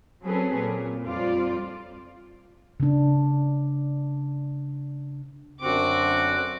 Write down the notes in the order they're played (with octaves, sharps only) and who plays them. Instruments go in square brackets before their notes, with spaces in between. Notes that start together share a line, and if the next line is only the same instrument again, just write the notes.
[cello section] F#3 C4 C#4 G#4 A4 B4
A#2
F2 G3 F4 C5 D5
[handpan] C#3 D4
[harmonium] F#2 D3 C4 [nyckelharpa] F#4 D6